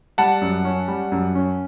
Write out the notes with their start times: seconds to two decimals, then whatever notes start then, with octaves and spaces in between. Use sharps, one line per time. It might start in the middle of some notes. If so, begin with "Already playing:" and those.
0.18 G3 F#5 A5
0.41 F#2
0.65 C#4
0.88 G3
1.12 F#2
1.35 C#4